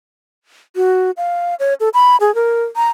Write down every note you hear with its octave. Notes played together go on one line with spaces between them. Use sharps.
F#4
F5
C#5
A4
B5
G#4
A#4
A#5